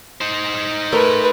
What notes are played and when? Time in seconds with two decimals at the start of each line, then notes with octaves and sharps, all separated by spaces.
0.21 D#4 C5
0.92 A3 A#4 B4 G5